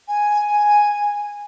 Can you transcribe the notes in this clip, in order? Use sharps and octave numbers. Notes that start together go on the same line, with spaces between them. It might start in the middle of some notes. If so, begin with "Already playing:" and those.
G#5